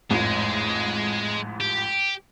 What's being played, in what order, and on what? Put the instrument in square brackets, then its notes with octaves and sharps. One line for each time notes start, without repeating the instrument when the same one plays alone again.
[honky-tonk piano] A1 F2 G#2 [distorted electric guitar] G#3
[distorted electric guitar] G4